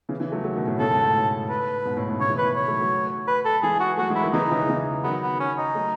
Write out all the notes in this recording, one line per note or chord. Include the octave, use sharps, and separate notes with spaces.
C#3 E3
C#3 E3
F#3 A3
F#3 A3
B2 D#3
A2
B2
A2 C#3 A4
G#2 B2
A2
B4
G#2 B2
A2
G#2 B2
A2 C#3 C#5
E3
B2 D#3 B4
C#5
F#3 A3
F#3 A3
B4
A4
E3 G#3 G#4
F#4
F#3 A3 F#4
E3 G#3
E4
D#3 F#3
C#3 E3 D#4
C#3 E3
C#3 E3
D#3 F#3 B3
B3
C#4
D#4
F#3 A3